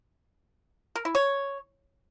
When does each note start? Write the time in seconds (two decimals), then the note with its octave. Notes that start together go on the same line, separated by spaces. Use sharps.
0.96 A#4
1.05 E4
1.15 C#5